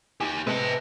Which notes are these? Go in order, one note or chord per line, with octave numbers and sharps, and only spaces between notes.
D#4 G4 G#5 D6
C3 G#3 B4 A5